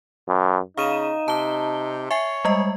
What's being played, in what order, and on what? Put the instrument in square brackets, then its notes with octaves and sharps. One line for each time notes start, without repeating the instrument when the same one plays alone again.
[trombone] F#2
[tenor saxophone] C#3 [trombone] D#4 [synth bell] F5 D#7 E7
[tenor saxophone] C3 [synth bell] A5 G7
[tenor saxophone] C#5 [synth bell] E5 G#5 C7
[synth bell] G3 G#3 D#5